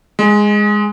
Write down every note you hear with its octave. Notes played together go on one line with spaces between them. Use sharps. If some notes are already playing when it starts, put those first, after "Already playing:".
G#3